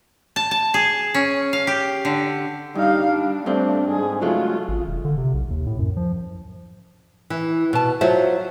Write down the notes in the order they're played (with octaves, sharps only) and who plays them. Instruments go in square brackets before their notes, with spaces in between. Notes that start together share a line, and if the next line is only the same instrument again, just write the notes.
[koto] A5
A5
G#4
C#4
F5
G4
D3
[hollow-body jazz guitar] G2 [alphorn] G3 [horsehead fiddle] D#4 F5
[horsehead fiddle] D4
[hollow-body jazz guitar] G2 C4 [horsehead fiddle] A3 [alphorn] D4
[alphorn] G#2 [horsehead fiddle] G#4
[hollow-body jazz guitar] C#3 F#3 G#3 [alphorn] A3 [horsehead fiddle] F4
[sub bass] G#1
E1
D3
C3
B1
D#2
A2
F#2
F3
[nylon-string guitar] E3
B2 A5
F#3 F4 F#4 C5 E5